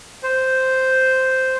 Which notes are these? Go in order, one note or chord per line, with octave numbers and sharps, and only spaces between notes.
C5